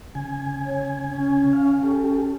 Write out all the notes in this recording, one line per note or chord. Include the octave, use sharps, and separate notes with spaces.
C#3 G#5
C#5
C#4
F5
G4 A4